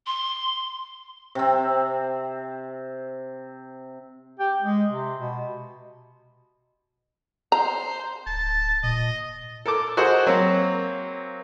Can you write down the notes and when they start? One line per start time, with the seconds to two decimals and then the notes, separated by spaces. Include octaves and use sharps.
0.07 C6
1.35 C3 C4
4.39 G4
4.61 G#3
4.90 C3
5.20 B2
7.52 C5 A#5
8.27 D1 A5
8.83 A#2 D#5
9.66 A4 A#4 A5 D6
9.97 F#4 G#4 A#4 C5 D#5 F#5
10.27 F#3 A#3 C4